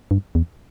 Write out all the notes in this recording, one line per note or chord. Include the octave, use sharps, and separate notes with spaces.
G2
E2